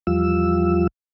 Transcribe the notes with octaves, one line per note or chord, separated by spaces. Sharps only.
E2 F3 G3 F4 E6